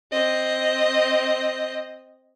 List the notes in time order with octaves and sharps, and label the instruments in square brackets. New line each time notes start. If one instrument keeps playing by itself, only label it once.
[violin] C4 D#5